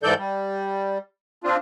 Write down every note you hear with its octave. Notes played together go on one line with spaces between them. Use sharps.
G#2 E3 A4 D5 G6
G3
C4 D4 F4